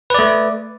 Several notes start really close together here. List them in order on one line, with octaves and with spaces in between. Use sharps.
B4 D5 A3